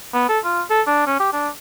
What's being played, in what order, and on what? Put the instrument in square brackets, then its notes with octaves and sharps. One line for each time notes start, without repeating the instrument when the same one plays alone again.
[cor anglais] B3
A4
F4
A4
D4
C#4
G4
D4